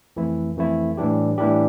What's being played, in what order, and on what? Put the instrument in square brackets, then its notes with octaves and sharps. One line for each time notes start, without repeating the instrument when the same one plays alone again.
[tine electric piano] F2 E3 A3 E4
F2 E3 A3 E4
A2 E3 G3 D4 G4
A2 E3 G3 D4 G4